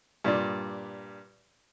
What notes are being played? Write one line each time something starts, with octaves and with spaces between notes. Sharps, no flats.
G2 A#2 D5